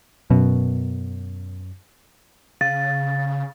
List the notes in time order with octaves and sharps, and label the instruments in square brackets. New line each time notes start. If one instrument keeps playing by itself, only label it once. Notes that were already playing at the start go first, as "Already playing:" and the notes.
[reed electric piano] F#2 [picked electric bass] B2
[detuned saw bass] C#3 [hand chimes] F5 [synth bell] A6